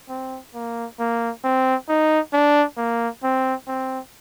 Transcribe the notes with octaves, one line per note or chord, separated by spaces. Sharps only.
C4
A#3
A#3
C4
D#4
D4
A#3
C4
C4